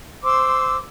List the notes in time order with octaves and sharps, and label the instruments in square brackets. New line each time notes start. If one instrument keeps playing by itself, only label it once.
[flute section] C5 C6 D6 E6